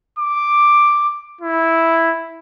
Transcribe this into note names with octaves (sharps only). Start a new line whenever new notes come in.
D6
E4